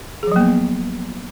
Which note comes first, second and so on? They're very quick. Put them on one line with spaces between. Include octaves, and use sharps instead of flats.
G#4 F3 F#3 A#3 B3